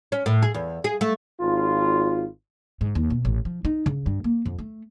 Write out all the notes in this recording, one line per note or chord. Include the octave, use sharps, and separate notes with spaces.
C#4
A2
G#4
E2
G#4
A3
G#1 F4
G#2
D#2
B2
A1
F3
D#4
C#3
G2
A#3
F2
A3